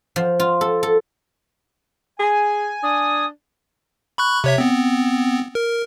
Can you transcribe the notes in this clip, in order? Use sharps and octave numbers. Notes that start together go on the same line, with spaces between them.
F3
F4
A4
A4
G#4 G#5
D4 D#6
B5 C#6 F#6
C3 C#5 E5
B3 C4
A#4